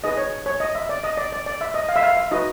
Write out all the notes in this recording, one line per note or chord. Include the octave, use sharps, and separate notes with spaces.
D#4 G#4 B4 D#5
C#5
C#5
D#5
E5
D5
D#5
D5
D5
D5
E5
D#5
F5
E5
F5
E5
D#4 F#4 B4 D#5